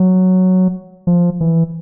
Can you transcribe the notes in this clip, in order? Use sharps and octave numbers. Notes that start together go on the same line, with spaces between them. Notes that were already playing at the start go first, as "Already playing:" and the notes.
Already playing: F#3
F3
E3